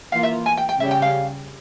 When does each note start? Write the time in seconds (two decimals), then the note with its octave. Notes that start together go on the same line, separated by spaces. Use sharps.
0.12 E3 A#3 F4 A#4 F5
0.23 E5
0.46 G#5
0.57 G5
0.69 G5
0.80 C#3 G3 C#4 G4 E5
0.91 G5
1.02 F5